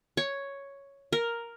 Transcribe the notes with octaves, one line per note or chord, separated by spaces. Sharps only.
C#5
A#4